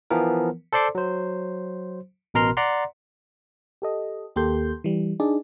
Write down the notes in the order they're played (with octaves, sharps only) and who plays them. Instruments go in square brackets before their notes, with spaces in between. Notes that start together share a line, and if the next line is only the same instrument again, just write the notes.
[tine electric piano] E3 F3 B3 A#4
A4 C5 D5 C6 D6
F#3 C5
A1 B2 A#4 A#5 C6 F6
D5 F#5 A#5 C6
[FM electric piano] G4 A4 D#5
D#2 A#3 G4 A4 C6 G6
E3 G3
D4 D#4 G#4 D5